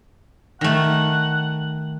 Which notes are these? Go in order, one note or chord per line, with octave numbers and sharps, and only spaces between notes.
D#3 A3 F#5